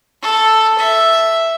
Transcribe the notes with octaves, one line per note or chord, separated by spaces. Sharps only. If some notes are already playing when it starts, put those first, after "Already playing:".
A4
E5